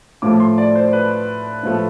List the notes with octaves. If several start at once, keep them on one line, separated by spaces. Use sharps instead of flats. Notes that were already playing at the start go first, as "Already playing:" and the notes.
A2 F3 A3 D6
C6
D5
C5
B4
A2 F3 A3